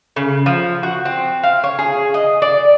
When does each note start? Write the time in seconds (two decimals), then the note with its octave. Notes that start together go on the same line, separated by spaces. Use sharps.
0.16 C#3
0.46 F3
0.83 F#4
1.05 C4
1.43 F5
1.64 C#5
1.79 G#4
2.14 D#5
2.42 D5